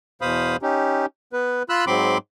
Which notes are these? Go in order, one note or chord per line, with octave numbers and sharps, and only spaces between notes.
E2 B2 C5 F5 B5 D#6
C#4 D#4 G4
B3 B4
F4 B5 E6 F#6
G#2 F#3 C4 B5 C6 D6